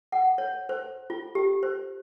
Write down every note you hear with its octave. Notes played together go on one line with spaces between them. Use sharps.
F#5
C#5
C5
F4
G4
C5